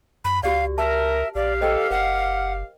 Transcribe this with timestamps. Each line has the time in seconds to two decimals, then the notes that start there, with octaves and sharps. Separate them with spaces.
0.25 F#2 B5
0.43 C#2 F#4 G4 D5 F5
0.78 A#4 E5 A5
1.35 A#1 G4 D5 F5
1.61 A4 C5 D#5 G5
1.91 F#1 A#4 F#5